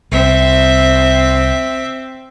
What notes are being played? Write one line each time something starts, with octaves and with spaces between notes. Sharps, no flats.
C2 C4 E5